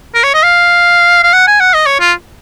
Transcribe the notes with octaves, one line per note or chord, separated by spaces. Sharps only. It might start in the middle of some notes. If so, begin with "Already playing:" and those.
A#4
C#5
D#5
F5
F5
F#5
G#5
F#5
D#5
C#5
F4